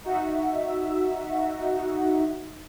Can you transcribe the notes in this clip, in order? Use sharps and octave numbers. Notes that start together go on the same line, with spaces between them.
D#4 F#4 E5